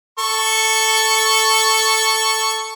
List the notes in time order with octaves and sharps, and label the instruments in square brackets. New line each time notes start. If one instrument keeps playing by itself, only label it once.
[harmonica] A4 C#6